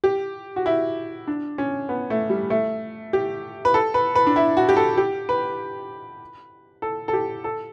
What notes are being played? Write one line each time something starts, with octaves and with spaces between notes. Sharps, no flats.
G4
F#4
E4
D4
C#4
B3
A3
G3
A3
G4
B4
A4
B4
B4
D4
E4
F#4
G4
A4
G4
B4
A4
A4
G4
A4